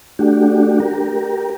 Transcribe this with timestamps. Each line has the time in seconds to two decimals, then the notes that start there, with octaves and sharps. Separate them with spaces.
0.19 A3 D4 F#4 G4
0.80 G4 A#4